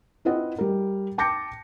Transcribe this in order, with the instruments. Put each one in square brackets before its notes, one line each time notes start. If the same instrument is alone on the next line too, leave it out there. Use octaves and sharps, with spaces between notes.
[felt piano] C4 E4 F4 B4 D#5 F#5
G3 A#4
G5 A5 D6 G6 A#6 C#7